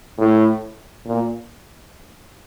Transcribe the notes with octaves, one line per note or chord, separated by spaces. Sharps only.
A2
A#2